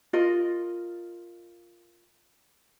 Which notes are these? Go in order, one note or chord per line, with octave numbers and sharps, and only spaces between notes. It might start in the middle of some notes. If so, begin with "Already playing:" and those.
F4 A#4 D#5